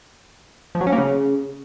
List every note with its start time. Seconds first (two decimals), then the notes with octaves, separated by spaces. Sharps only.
0.75 F3
0.81 F#3
0.87 C#4
0.92 A#3
0.98 C#3